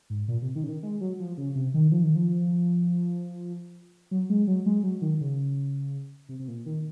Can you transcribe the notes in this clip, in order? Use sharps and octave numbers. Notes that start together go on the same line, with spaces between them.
G#2
A#2
C3
D#3
C#3
D#3
G#3
F#3
F3
C#3
C3
D#3
F3
D#3
F3
F#3
G#3
F#3
G#3
F#3
D#3
C#3
C3
C3
A#2
D#3